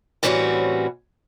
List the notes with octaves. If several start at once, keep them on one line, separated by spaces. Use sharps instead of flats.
A2 E3 G3 C4 C#4 F#4